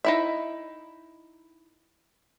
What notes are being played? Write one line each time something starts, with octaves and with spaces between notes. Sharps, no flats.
D#4 E4 E5